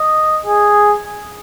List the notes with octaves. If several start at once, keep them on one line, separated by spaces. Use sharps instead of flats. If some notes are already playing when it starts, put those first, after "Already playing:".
Already playing: D#5
G#4